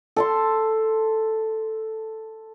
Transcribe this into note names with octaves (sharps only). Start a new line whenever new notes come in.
A4 A5 C6